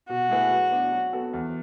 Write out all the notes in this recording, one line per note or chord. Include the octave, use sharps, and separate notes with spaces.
B2 F#4
A3 E4 G#4 B4
F#3
B3 D4
F#3
B3 F#4 A4
E2